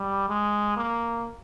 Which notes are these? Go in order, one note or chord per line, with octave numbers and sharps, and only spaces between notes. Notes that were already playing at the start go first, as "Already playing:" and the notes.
Already playing: G3
G#3
A#3